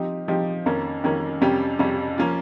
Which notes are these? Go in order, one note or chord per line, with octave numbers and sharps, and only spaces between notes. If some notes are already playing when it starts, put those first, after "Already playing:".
Already playing: F3 C4 D#4 G4
F3 C4 D#4 G4
F2 D#3 A#3 C#4
F2 D#3 A#3 C#4
F2 C3 G3 C#4 G4
F2 C3 G3 C#4 G4
F3 A#3 C#4 F4